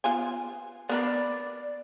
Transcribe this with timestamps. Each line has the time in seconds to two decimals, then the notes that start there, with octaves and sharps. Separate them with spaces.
0.04 B3 F4 G#5
0.89 B3 A#4 D5 B5